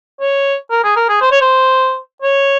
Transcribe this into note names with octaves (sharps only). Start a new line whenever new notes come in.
C#5
A#4
G#4
A#4
G#4
C5
C#5
C5
C#5